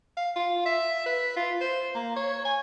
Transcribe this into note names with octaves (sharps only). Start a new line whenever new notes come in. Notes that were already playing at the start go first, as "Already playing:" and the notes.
F5
F4
E5
B4
F4
C5
A#3
C#5
G#5